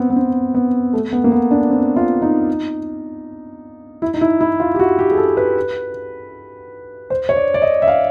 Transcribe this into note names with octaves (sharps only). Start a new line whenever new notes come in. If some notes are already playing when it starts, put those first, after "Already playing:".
Already playing: B3 C4
B3
C4
B3
A3
B3
A#3
B3
D4
C4
F4
D#4
E4
D#4
E4
E4
F4
G4
F#4
G4
G#4
A4
B4
C5
C#5
D5
D5
D#5
E5
F5